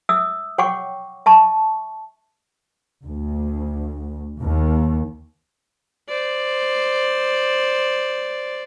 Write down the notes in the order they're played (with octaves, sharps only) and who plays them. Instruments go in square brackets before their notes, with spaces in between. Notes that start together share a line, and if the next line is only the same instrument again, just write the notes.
[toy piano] E5 D#6 E6
C#5 F#5 G5 C#6 D6
E5 A5 C#6
[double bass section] D2
D#2
[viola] C5 D5